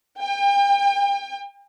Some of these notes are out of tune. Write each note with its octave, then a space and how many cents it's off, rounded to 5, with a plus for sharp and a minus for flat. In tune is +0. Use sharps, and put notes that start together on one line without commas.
G5 +40